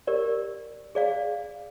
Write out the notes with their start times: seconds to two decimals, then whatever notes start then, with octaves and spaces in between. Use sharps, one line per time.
0.07 G4 A#4 D5
0.95 G#4 D5 F5